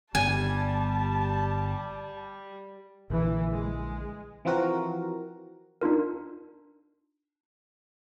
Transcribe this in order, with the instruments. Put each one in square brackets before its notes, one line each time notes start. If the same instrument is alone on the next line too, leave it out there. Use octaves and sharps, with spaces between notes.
[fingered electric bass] G1 [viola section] G3 [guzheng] G#5 [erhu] A5
[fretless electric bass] A#1 A#2 D3 [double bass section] E3
[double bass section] G#3
[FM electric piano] E3 F3 C4 F#4 A#4
[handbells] D4 D#4 F4 A#4